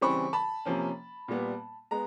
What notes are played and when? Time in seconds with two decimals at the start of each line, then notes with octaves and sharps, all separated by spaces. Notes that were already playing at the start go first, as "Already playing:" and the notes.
0.01 C#3 E3 G3 C4 B5 C#6
0.33 A5 B5
0.65 C3 F3 A#3 C#4
1.28 A#2 G3 B3
1.91 G#3 B3 A#5